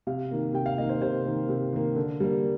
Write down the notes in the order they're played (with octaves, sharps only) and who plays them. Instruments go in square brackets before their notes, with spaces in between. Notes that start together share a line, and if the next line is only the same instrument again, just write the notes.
[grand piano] C3 F5
D#3 A#3
C3 G5
F5
D#3 A#3 D#5
C5
C3 C5
D#3 A#3
C3
D#3 A#3
D3
G3 A#3